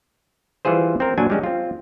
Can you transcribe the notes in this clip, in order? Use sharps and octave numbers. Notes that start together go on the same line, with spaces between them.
E3 G3 F4 G#4 C5
C4 A#4
A#2 F#3 D4 G#5
G3 G#3 C#4
C4 F4